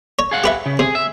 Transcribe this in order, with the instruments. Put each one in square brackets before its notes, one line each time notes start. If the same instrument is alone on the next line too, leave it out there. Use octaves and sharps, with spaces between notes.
[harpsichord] C#5
[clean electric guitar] G#4 F5 F#5
[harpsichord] G4 B4 E5
[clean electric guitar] C#3
[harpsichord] C3 [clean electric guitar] G#4
[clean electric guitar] E5